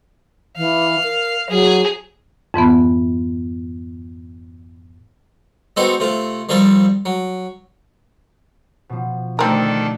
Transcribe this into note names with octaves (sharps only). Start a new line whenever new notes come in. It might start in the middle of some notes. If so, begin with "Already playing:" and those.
E3 F5
A#4
F#3 G#4
F2 G#2 E3 B3
G#3 B3 C4 D#4 F#4 A4
C3 A3 F4
D#3 F3 G3 C4 A4
F#3
B2 F3
D2 D#3 C4 D4 A4 A#4